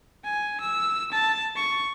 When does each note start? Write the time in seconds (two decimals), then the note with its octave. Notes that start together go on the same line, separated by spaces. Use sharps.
0.25 G#5
0.61 E6
1.12 A5
1.56 C#6